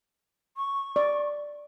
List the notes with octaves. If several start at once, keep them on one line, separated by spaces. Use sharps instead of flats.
C#6
D5